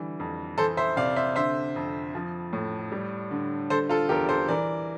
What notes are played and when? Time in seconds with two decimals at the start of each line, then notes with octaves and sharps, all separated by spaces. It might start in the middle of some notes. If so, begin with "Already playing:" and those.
Already playing: D3 E3 G3
0.20 F2
0.58 E3 A4 C5
0.77 C5 E5
0.97 C3 D5 F5
1.16 C5 E5
1.36 D3 C5 E5
1.76 F2
2.15 F3
2.53 A2
2.92 G3
3.31 D3
3.70 D3 A4 C5
3.89 F4 A4
4.09 E2 G4 A#4
4.29 A4 C5
4.48 E3 A#4 D5